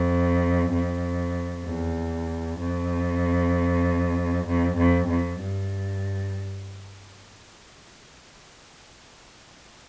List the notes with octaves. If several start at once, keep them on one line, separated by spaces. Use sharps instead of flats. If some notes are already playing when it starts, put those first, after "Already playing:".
Already playing: F2
F2
E2
F2
F2
F2
F2
G2